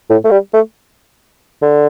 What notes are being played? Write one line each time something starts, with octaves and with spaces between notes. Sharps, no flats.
A2
A3
G3
A3
D3